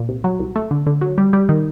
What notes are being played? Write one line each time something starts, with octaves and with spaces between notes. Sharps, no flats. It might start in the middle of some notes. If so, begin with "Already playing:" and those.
Already playing: A#2
C2
F#3
C2
A3
D3
D3
F#3
G3
G3
D#3